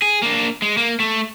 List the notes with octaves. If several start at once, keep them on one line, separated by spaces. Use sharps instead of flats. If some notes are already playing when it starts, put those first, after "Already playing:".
G#4
A#3 D4
G#3
A#3
A3